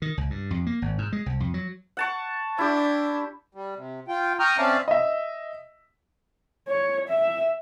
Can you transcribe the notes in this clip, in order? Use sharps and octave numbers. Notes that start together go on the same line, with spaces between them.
D#3
C#2
G2
F2
A#3
G#1
G#2
G#3
C2
F2
F#3
F#5 A5 C#6
D4 E4 G4
G3
C3
F4 G5
G5 A#5 C#6 D#6 F6 G6
C4 C#4 D5 E5 F5 A5
D#5 E5
C#5
E5